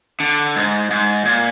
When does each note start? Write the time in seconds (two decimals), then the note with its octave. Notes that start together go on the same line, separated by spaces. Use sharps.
0.20 D3
0.56 G#2
0.91 G#2
1.25 A#2